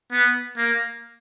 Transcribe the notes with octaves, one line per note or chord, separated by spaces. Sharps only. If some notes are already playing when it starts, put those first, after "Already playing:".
B3
A#3